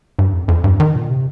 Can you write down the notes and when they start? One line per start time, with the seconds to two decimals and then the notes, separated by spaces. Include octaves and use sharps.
0.19 G2
0.33 F2
0.48 F2
0.64 G2
0.80 D#3
0.96 A#2
1.10 C3